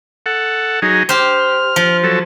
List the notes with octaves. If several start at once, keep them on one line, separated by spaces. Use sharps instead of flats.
A4 F#5
F#3 D#4 G#4
G4 C5 F6
F3
F#3 A4